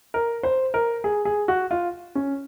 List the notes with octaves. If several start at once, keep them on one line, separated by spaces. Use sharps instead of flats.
A#4
C5
A#4
G#4
G#4
F#4
F4
C#4